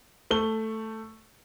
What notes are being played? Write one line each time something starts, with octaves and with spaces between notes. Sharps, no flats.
A3 G7